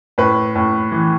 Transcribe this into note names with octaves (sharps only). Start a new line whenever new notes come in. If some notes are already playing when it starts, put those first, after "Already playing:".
A2 B4
A2
E3